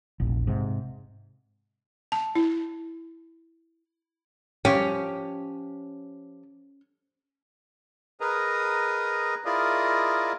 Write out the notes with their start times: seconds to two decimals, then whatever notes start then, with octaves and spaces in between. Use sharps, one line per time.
0.20 E1 A#1
0.47 G#2 C3
2.12 A5
2.35 E4
4.65 F3 C#4 G4 G5
8.21 G#4 A#4 B4 D#5 A#5
9.45 E4 F4 G#4 A#4 D5 D#5